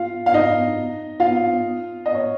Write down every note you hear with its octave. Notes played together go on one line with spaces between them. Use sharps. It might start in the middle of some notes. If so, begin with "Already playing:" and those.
Already playing: F4 F5
F5
D#4 D#5
F4 F5
D#5
C#5